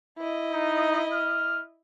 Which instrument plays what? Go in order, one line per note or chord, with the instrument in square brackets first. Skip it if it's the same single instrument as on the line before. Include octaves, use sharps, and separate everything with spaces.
[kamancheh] E4 D#5
[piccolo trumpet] D#4
F6